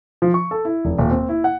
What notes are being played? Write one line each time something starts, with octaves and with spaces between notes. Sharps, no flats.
F3
C#6
A4
E4
F1
D#1
C4
E4
F#5